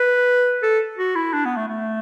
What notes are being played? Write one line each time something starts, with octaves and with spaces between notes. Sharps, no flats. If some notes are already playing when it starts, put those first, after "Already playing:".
Already playing: B4
A4
F#4
E4
D4
B3
A3
A3